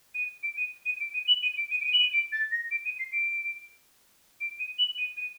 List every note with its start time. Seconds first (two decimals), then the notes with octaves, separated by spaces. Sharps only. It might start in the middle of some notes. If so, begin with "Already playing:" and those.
0.14 D#7
0.42 D7
0.56 D#7
0.85 D#7
0.99 D7
1.13 D#7
1.27 F#7
1.42 D#7
1.57 D7
1.70 D#7
1.80 D7
1.84 D#7
1.92 F#7
1.99 D#7
2.12 D7
2.32 A6
2.51 A#6
2.70 D7
2.85 D#7
2.98 C7
3.12 D7
4.40 D7
4.59 D#7
4.78 F#7
4.97 D#7
5.16 D#7